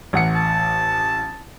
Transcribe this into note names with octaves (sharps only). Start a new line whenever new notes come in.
A1 F#5 C#7
A5